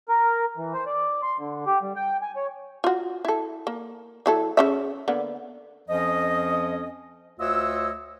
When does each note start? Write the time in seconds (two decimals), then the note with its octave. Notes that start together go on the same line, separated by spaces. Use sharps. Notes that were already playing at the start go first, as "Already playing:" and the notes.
0.09 A#4
0.57 E3
0.74 C5
0.86 D5
1.23 C6
1.39 D3
1.67 G4
1.82 G3
1.96 G5
2.22 G#5
2.36 C#5
2.84 F4 F#4
3.25 E4 A4
3.67 A#3
4.26 F#3 E4 A4
4.57 C#3 C#4 E5
5.08 D3 A#3 B3
5.88 F2 F3 C#4 D#5
7.40 D2 F4 C#5 D#5 E6